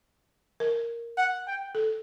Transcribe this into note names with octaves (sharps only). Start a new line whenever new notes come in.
A#4
F#5
G5
A4